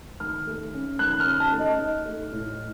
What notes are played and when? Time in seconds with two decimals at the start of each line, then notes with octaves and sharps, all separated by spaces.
0.20 D#3 F6
0.47 A3
0.74 C#4
0.99 D#3 F#6
1.20 F6
1.27 C#4
1.40 A5
1.52 A3
1.59 D#5
1.79 D#4 D#5
2.05 A3
2.32 A2